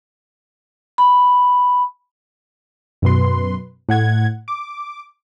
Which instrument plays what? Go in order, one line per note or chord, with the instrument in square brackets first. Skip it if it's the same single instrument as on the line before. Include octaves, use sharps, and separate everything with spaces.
[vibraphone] B5
[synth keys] F#2 B2 B4 C6
A2 F#5 G#6
D6